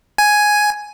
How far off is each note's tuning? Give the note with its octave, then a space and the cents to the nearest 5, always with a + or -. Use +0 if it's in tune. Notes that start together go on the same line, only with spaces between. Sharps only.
G#5 +5